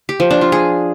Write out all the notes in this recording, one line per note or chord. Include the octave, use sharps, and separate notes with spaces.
G4
F3
D4
F4
G#4